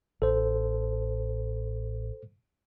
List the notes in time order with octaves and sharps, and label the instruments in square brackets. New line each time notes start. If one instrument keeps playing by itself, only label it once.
[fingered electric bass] A1 [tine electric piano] A4 C5